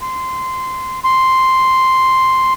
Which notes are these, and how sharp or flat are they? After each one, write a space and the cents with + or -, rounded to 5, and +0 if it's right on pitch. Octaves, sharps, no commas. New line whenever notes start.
C6 -15
C6 +0